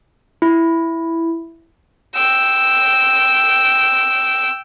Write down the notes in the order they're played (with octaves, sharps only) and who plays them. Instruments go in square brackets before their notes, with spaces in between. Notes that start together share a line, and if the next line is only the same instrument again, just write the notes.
[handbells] E4
[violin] G5 E6